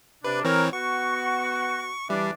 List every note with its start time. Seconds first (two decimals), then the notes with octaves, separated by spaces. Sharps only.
0.25 C3 D4 B4
0.45 E3 C4 A#4 C#5
0.73 B3 F#4 C#6
2.10 E3 G3 D4